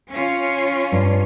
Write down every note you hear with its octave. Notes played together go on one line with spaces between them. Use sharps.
C#4 F4
G2